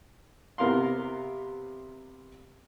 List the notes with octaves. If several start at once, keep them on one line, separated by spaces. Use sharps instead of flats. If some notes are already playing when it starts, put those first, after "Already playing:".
C3 B3 A#4 F5 C6